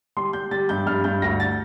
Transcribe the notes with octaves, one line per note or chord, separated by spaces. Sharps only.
G3 C6
G3 G6
G3 A6
G2 G6
G2 F6
G2 G6
D2 A#6
A6